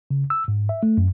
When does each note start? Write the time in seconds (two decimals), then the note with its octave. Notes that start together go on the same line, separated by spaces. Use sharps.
0.11 C#3
0.30 E6
0.48 G#2
0.69 E5
0.83 A3
0.97 F#2